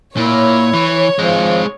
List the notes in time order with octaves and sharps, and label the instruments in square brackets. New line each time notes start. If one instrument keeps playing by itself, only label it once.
[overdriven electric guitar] A#2 A#3 [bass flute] E4 [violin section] C#5
[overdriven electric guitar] E3
[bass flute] F3 [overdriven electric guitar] G#3 C4